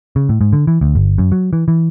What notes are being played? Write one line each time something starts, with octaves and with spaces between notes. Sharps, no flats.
C#3
A2
G#2
D3
E3
D2
G1
F#2
F#3
E3
E3